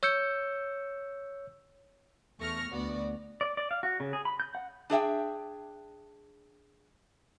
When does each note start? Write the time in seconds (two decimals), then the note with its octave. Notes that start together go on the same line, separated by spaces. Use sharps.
0.03 C#5 E6 G6 C#7
2.39 E2 A3 C#6 F6 A#6
2.72 D2 B3 F#4 D5
3.41 D5
3.57 D5
3.71 F5
3.83 F#4
4.00 C#3
4.13 G#4
4.25 B5
4.40 G6
4.55 F#5
4.90 D4 G#4 E5 G5